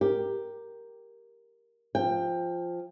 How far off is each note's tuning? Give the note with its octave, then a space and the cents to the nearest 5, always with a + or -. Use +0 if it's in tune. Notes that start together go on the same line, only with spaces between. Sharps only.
G4 +0 A#4 +0
F3 +0 G5 +15